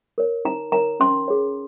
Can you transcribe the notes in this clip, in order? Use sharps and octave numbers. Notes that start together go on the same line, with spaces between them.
A#4 C#5
D#4 A#5
A#4 C#5 A#5
C#4 C6
G#4 C#5